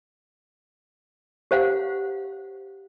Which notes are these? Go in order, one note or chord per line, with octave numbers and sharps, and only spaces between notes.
G4 C5 F5 F#5